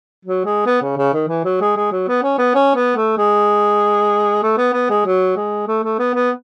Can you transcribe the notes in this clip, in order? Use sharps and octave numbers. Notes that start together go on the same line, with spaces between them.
F#3
G#3
B3
C#3
C#3
D#3
E3
F#3
G#3
G#3
F#3
B3
C#4
B3
C#4
B3
A3
G#3
A3
B3
B3
G#3
F#3
G#3
A3
A3
B3
B3